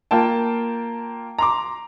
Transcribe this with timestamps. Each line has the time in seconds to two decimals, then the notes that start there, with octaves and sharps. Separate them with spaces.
0.11 A#3 F4 G5 A5
1.38 A#5 C6 D6